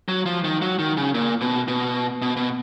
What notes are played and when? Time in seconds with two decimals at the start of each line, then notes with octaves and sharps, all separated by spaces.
0.09 F#3
0.26 F3
0.44 D#3
0.62 F#3
0.79 D#3
0.97 C#3
1.14 A#2
1.41 B2
1.68 B2
2.22 B2
2.37 B2